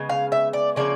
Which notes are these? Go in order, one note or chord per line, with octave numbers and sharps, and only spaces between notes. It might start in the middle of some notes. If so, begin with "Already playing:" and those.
Already playing: C#3 G#3 B3
F5
E5
D5
C#3 F3 A#3 C#4 D5